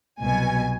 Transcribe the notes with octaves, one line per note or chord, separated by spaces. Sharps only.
C2 B2 F#3 G#5